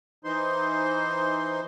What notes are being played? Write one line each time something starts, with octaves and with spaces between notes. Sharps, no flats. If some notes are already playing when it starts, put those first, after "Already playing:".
E3 D#4 C5 C6